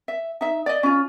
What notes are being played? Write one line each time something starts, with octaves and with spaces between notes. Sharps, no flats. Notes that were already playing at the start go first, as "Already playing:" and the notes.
E5
D#4 E5
D5 D#5
C#4 F4